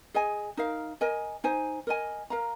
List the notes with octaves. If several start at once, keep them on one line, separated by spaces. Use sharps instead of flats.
G#4 D#5 G#5
D#4 A#4 F5
A#4 D#5 G#5
D#4 C5 G#5
A#4 D#5 G#5
A#4 F5 A#5